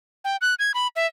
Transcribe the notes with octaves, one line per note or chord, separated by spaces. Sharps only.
G5
F#6
G#6
B5
E5